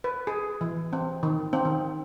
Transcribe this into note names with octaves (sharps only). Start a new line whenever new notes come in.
B4
G#4
E3
C4
D#3
C4
D#3